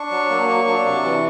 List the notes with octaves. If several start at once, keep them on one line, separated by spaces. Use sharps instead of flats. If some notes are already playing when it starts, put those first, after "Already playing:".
Already playing: D4 C#6
F#3
A#3
F#3
D4
C3
E3